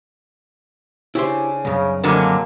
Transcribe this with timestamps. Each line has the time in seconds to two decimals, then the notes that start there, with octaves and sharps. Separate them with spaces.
1.15 C#3 C#4 D4 E4 G4 C5
1.65 C2 F#2 C#3 A#4
2.03 F2 D3 F#3 A#3 G#4 D#5